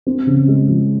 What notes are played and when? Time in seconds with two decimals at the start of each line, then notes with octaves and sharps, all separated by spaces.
0.07 C4
0.27 C#3
0.48 G#3
0.68 F3